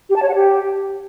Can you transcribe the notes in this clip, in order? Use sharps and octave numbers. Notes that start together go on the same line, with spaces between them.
G4
A5
C#5
F#5
G4